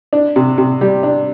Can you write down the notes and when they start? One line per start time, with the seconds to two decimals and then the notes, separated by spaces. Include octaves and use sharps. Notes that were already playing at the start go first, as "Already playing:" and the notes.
0.13 D4
0.36 C3
0.58 C3
0.81 G3
1.03 D4